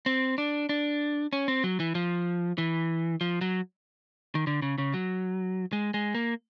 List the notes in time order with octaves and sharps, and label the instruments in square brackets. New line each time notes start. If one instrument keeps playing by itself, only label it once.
[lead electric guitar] C4
D4
D4
C#4
C4
F#3
E3
F3
E3
F3
F#3
D#3
D3
C#3
C#3
F#3
G#3
G#3
A#3